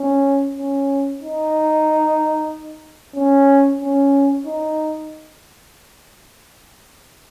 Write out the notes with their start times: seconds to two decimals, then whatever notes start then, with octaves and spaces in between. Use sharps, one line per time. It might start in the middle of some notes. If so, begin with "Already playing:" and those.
Already playing: C#4
0.55 C#4
1.21 D#4
3.15 C#4
3.81 C#4
4.46 D#4